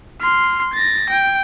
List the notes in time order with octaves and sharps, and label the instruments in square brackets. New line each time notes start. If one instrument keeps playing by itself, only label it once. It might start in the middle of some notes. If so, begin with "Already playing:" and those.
[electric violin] C6 F6
A6 A#6
G5